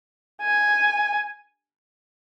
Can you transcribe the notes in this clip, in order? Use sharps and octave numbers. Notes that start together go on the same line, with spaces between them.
G#5